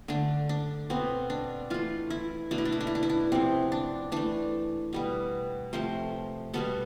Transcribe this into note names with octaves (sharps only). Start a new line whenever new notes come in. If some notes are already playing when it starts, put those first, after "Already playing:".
D3 A3 D4
D4
B2 B3 C4
D4
E3 A3 F4
E4
B2 A3 D4
E4
D4
E4
D4
E4
D4
E4
D4
C3 F3 B3 C4
D4
E3 A3 D4
B2 G3 B3
C3 F3 A3 C5
B2 G3 B3 A4